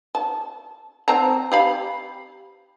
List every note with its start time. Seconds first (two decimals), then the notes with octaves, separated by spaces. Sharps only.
0.15 A5
1.08 C4 A5 A#5
1.52 G4 F5 B5